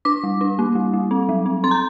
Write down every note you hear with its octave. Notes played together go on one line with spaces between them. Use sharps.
D4 D6
G3
D4
A#3
G3
G3
C4
F#3
C4
C4 C6
A#5